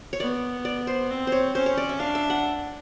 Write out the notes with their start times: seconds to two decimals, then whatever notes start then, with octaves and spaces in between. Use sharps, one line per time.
0.13 C#5
0.20 B3 D5
0.65 D5
0.87 C5
1.11 C4
1.27 C5 C#5
1.55 C#4 C5
1.66 C#5
1.77 D5
1.89 E5
1.99 D4 F5
2.15 E5
2.30 F#5